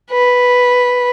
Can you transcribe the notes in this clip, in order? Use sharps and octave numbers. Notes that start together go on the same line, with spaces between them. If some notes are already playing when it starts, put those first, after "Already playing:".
B4